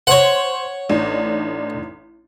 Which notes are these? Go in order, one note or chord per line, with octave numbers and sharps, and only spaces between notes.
C5 C#5 F#5 C6
A1 D4 D#4